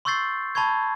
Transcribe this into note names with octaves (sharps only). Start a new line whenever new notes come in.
C6 C#6 E6 G6 A6 C7
A5 B5 C#6 G#6